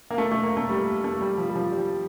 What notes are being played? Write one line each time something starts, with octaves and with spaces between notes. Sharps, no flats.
A#3
A3
A3
A#3
A3
G3
A3
G3
F3
G3
F3
G3